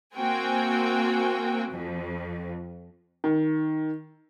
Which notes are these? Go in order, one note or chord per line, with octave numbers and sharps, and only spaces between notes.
A#3 C4 F#4 G5 G#5
F2
D#3